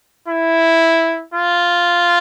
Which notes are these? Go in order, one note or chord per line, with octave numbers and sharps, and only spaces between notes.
E4
F4